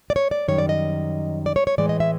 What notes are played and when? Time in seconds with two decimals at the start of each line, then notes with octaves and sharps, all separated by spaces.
0.10 D5
0.16 C#5
0.31 D5
0.48 F#2 D#3 G3 C#5
0.58 D5
0.69 D#5
1.46 D5
1.56 C#5
1.67 C#5
1.78 A2 E3 G#3 D5
1.89 D#5
2.00 E5